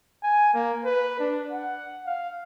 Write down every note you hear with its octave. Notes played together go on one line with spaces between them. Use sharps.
G#5
A#3
B4
D4
F#5
F5